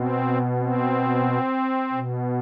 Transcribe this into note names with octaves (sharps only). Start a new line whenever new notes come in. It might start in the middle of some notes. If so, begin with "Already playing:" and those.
Already playing: B2 C4
C4
B2